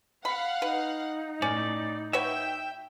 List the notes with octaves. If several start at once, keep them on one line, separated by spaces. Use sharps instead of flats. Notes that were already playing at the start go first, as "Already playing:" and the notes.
F5 F#5 B5
D#4 B4
A2 C#4 D5
F#4 B4 C#5 E5 G5